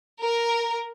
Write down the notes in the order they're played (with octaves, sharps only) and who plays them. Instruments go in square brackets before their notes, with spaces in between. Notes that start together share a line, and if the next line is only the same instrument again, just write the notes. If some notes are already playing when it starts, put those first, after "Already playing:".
[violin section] A#4